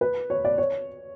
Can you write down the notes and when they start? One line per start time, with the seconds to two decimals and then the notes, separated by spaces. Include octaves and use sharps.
0.01 B4
0.30 C#5
0.45 D5
0.58 C#5